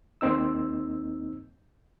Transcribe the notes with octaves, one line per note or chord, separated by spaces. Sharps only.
D#2 A#3 C4 D#4 E6